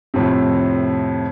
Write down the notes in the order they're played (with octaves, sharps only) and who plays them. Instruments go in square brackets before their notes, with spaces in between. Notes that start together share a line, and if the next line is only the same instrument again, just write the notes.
[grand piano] F2 A2 C3